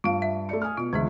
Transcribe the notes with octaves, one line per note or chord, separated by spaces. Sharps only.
G2 F4 F5
E5
A3 D5 C#7
G#5 D#6 F6
B2 F4
C#2 D3 E3 G#4 E5